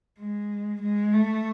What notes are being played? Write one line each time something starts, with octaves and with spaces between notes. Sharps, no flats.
G#3
G#3
A3